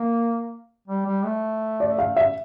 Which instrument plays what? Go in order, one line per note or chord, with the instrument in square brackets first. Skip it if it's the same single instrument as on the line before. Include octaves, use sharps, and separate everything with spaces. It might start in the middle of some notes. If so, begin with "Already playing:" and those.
Already playing: [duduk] A#3
G3
G3
A3
[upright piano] D5
F5
E5